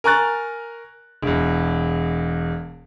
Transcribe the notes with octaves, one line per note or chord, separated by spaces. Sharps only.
A#4 G#5 A#5 C#6 F#6 A6
E1 E2